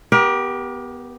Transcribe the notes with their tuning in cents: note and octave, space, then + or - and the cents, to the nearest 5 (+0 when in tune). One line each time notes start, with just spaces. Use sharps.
B3 +0 G4 +0 A#4 +35